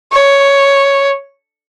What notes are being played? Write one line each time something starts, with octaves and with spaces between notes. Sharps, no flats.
C#5